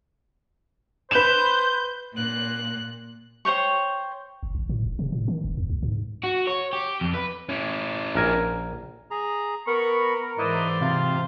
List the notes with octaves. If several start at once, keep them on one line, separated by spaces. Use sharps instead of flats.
B4 C5 G6 E7
A#2 F#6
C5 C#5 G5 C#6
F#1
A1
A2
E1
C3
A2
D#3
E1
D#2
C#2
G#2
F#4
C#5
G4
F2
B4
C#4 E4
A#1 A#4 G#5
G#4 A#5
B3 A#4 B5 C#6
G#2 E3 E4 B4 C5 D5 D#5
C3 F4 F5